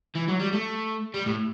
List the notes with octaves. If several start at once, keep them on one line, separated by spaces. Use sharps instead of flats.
E3
F#3
G3
A3
G3
A2